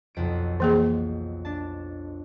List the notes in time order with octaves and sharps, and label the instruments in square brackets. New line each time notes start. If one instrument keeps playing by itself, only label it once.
[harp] B1 F2 D7
[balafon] E3 A#3 G#4
[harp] D4 A5